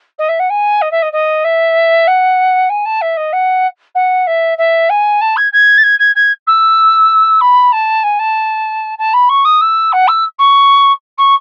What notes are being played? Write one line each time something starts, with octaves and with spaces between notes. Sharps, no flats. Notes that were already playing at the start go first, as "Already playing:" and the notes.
D#5
E5
F#5
G#5
D#5
E5
D#5
D#5
E5
F#5
G#5
A5
E5
D#5
F#5
F#5
E5
E5
G#5
A5
G#6
G#6
A6
G#6
G#6
G#6
E6
B5
A5
G#5
A5
A5
B5
C#6
D#6
E6
F#5
E6
C#6
C#6